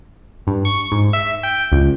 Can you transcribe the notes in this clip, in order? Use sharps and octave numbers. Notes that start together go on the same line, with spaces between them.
G2
C#6
G#2
E5
G5
C#2